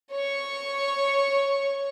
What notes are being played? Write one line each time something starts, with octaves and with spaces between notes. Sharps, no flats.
C#5 C#6